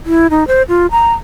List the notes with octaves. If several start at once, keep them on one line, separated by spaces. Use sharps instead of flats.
E4
D#4
C5
F4
A#5